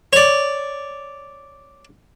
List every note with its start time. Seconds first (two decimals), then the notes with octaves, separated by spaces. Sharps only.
0.13 C#5 D5